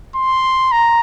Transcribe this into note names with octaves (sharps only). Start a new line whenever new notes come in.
C6
A#5